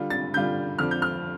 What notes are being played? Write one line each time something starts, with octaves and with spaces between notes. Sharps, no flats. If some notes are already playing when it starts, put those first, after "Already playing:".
Already playing: D3 G3 F4
A6
D3 G3 F4 G6
F2 D3 F3 D4 F6
G6
F6